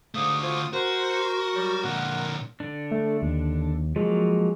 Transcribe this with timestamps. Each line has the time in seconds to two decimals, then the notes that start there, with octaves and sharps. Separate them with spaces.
0.15 G#2 D3 A3 F5 D#6
0.42 F4 C5 C#5 D#6
0.73 F#4 A#4 C5
1.55 F#3 G3
1.84 A#2 D3 A#3 F#5
2.60 D3 D4
2.91 A3
3.22 D#2
3.96 F3 F#3 G#3 A#3